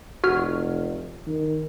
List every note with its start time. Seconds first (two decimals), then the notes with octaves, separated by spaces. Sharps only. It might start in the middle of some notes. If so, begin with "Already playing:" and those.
0.24 F1 F#4 F6
1.27 D#3